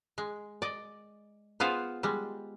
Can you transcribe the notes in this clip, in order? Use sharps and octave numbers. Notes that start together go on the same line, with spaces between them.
G#3
D5 D#5
B3 F4 G#4 C5 F5
G3 G#3